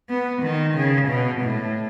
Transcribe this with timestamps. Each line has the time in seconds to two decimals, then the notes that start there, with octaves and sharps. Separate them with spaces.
0.10 B3
0.43 D#3
0.75 C#3
1.09 B2
1.42 A2